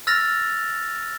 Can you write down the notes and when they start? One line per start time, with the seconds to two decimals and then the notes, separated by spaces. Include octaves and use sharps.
0.07 E6 F6 A6 A#6 F7